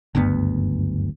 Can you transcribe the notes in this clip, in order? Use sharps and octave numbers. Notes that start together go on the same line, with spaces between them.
F#1 D2 G2 B3